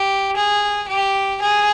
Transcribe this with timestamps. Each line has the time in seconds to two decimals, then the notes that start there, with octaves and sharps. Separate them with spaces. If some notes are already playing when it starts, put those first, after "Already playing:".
Already playing: G4
0.37 G#4
0.88 G4
1.42 G#4